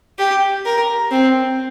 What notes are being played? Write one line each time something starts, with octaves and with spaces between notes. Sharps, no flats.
G4
A#4
C4